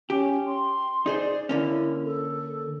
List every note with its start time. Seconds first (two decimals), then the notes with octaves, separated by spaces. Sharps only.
0.10 C#4 G4
0.47 C6
1.06 D#4 G#4 C5 D5
1.49 D3 A#3 C#4 E4
2.05 A4